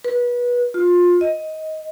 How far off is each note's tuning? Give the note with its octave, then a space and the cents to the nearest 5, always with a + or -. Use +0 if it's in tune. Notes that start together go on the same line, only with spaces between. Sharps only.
B4 -25
F4 +20
D#5 +15